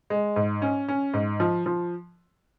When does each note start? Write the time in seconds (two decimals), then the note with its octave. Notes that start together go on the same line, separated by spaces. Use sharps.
0.10 G#3
0.36 G#2
0.62 C#4
0.88 C#4
1.13 G#2
1.40 F3
1.66 F3